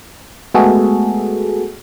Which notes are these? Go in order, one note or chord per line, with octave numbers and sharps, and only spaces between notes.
G#3 A3 B3 F#4 G#4 A4